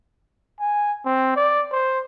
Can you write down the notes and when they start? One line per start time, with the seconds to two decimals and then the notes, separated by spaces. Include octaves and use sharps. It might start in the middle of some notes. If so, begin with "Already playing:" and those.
0.60 G#5
1.06 C4
1.36 D5
1.72 C5